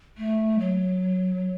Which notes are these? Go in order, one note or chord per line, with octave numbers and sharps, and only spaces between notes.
A3
F#3